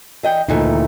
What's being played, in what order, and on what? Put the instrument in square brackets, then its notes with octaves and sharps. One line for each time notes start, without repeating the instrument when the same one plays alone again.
[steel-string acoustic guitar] E3 D#5 G5
[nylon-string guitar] D2 A#2 D#4 [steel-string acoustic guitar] D#3 E3 A3